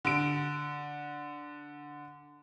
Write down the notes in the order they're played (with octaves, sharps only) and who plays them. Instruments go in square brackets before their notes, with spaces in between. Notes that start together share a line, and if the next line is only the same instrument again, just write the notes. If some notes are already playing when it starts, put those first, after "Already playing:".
[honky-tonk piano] D3 D7